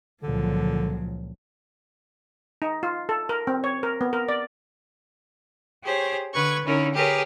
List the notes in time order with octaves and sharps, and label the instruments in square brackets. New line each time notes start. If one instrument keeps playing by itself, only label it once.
[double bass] C#2 A#2 [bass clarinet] D3 [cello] F3 F#3
[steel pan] D#4
F4
A4
A#4
C4
C#5
A#4
B3
A#4
D5
[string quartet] G4 G#4 C5 C#5
D3 B4 C#6 G#6
D3 C#4 D#4 E4 A#4 C#5
G4 G#4 A#4 B4 C#5